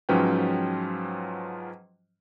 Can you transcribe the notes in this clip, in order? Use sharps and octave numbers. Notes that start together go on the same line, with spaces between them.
G#2 F3 F#3 C#4 B4 G5